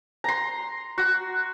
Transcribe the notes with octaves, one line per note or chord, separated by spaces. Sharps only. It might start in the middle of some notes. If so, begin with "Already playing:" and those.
A#5 C6
F#4